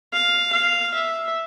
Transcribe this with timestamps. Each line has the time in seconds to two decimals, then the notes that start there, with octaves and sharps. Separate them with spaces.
0.13 F5
0.53 F5
0.94 E5